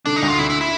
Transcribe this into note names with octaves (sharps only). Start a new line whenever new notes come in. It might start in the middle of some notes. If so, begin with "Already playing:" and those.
D3 D4
D#4
D2
F4
D3 E4
E4
E4